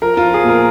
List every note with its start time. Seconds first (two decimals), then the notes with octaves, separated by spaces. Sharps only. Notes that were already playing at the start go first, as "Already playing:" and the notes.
0.02 F3 A#4
0.17 F4
0.23 F3
0.34 G#4
0.44 A#2 A#4